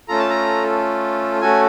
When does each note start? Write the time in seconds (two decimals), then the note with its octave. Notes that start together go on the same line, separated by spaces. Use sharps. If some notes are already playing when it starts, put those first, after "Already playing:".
0.08 A3 C#4 F4 A4 A#5
0.19 A5
0.30 A#5
1.41 A3 C#4 F#4 A4 G#5